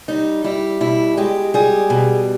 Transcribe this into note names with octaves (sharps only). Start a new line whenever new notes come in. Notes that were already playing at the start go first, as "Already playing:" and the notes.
G3 D#4
G3 E4
B2 E4
G#3 G4
G3 G#4
B2